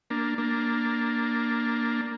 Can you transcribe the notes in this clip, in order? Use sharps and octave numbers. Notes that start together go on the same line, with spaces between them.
A#3 D4
A#3 D4